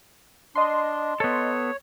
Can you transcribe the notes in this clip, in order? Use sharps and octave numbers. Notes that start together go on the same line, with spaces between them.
D4 D#5 C6
B3 A4 C#5